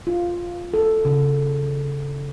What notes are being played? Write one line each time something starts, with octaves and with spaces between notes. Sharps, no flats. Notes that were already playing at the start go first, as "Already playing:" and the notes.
F4
A4
C#3